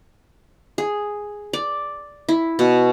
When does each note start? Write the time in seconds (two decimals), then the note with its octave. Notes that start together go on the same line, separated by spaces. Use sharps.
0.78 G#4
1.53 D5
2.29 E4
2.59 B2